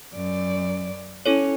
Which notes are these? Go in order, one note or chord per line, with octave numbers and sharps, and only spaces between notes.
F#2 D5
C#4 E4 A4 C#5